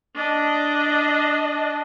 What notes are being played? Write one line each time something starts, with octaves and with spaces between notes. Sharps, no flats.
D4 D#5